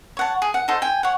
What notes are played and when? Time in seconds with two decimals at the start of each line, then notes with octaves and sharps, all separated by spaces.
0.17 C#5 F#5 A5
0.42 G#4
0.54 F#5
0.68 D#4 A4 C5
0.82 G5 G#5
1.03 C#5 F#5